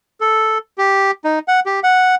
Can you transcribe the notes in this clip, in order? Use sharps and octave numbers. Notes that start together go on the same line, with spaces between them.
A4
G4
D#4
F#5
G4
F#5